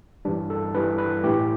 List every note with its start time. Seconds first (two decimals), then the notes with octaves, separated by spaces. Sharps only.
0.25 G2 E3 G3 D4
0.50 A4
0.74 G2 E3 G3 B4
0.98 B4
1.24 A2 E3 A3 G4